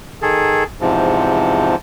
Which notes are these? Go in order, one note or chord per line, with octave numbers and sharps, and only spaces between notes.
D#3 G#4 A4
E2 G#2 C3 F3